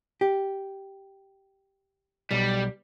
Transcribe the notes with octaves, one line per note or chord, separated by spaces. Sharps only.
G4
B1 G3